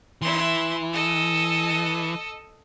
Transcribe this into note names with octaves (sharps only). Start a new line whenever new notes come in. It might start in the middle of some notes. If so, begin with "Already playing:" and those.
E3 E4 C6
A4 D#5